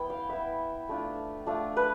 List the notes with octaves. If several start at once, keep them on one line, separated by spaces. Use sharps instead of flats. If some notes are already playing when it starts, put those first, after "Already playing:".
Already playing: B3 E4 G5
F5
B3 E4 E5
A3 D4 F4
A3 D4 F4
B4